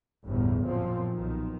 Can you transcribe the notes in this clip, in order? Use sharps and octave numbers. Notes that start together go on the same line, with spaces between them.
G1 E2 A2
F#2 A#2 F3 C4
B1 D#3